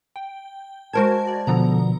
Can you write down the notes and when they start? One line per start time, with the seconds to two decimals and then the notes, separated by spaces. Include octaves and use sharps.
0.16 G5
0.93 G#3 F#4 A#4 C5 A5 G#6
1.27 D5
1.47 B2 D3 F3 B3 A#5